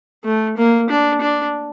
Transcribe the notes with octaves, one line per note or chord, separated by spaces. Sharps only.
A3
A#3
D4
D4